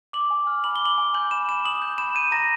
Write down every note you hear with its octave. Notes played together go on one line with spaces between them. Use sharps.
D6 F#7
G#5
F6
B5 F#7
G7
D6 F#7
G#5
G6 F#7
B5 E7
B5 E7
D#6 F#7
G6
B5 E7
G6 D#7
A#5 A#6